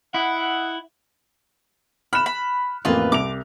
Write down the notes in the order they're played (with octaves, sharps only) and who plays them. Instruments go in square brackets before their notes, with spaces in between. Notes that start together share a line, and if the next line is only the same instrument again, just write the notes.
[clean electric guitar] E4 [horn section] D#5 F#5
[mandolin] B5 [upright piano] F6 F#6 E7
[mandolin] B5
[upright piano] A1 F2 A#3 [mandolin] F4 B4
[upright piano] C2 F7 [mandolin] D6